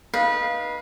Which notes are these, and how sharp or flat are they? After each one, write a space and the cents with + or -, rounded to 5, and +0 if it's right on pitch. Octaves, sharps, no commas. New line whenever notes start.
D#4 +0 B4 -25 F5 +0